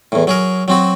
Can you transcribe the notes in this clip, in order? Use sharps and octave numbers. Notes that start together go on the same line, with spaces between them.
E2 A2
F#3 G#4 A#4
F#3 C4 F#4